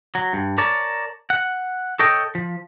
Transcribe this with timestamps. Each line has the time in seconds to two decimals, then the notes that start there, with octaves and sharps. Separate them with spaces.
0.15 F#3
0.33 G2
0.58 A#4 C#5 D5 A5
1.30 F#5
1.99 A4 C#5 D#5 G5
2.35 F3